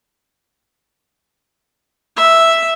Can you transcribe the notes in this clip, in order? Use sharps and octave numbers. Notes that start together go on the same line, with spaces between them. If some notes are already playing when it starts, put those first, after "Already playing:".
E5